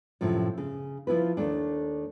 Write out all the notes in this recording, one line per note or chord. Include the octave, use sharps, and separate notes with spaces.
F#2 A2 C3 F3
C#3
F3 E4 F4 B4
D#2 A3 D4